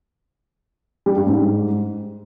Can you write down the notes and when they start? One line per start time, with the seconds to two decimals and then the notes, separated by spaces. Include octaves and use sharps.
1.06 G3
1.16 G2
1.27 G#2